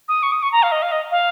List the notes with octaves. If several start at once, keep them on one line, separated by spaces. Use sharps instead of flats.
D#6
C#6
D#6
C#6
A#5
F5
D#5
F5
D#5
F5